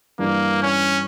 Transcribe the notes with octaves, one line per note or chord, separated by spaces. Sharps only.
G2 E3 G3 A#3 D4
C#4